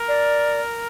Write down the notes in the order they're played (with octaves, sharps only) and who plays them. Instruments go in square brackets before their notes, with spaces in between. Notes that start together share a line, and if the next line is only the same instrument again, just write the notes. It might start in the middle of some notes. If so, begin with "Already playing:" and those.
Already playing: [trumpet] A#4
[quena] D5